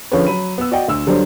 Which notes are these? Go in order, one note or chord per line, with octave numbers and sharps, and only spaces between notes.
D3 F3 C#4 G#4 B4 C#5
F#3 B5 D#7
B3 E6
F#4 D5 D#5 F#5 G5
D2 E6
D3 F#3 G3 D4 C5